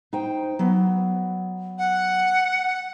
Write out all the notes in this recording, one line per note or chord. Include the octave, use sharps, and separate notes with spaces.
D#4 C5 G5
F#3 B3
F#5